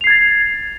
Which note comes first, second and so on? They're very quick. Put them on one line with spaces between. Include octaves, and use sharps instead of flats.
F7 C7 G#6 A6